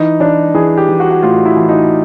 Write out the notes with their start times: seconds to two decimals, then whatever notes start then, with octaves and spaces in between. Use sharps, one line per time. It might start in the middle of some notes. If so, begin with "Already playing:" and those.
Already playing: E3 D#4
0.20 E3 D4
0.54 E3 G#4
0.77 G4
0.89 E3
1.00 F#4
1.11 F#4
1.23 A2 F4
1.46 E4
1.57 E3
1.69 D#4